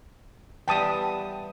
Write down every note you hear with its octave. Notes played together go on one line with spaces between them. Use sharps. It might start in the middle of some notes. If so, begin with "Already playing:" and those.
E3 G3 B3 G5 A5 D#6